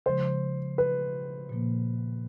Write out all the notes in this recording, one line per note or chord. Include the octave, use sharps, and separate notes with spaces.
C#3 F3 G#3 C5
B4
A#2 F3 A#3